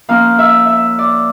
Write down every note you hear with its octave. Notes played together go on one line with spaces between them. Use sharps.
F3 A#3 C#4 F5
E5
E5
D5